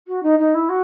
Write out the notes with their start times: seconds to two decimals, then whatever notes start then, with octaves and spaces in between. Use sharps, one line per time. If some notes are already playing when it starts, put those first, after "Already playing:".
0.07 F#4
0.22 D#4
0.39 D#4
0.54 E4
0.69 F#4